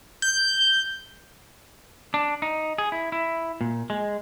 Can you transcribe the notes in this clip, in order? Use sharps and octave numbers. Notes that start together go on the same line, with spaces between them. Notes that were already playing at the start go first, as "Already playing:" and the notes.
G6
D4
D#4
G#4
E4
E4
A#2
G#3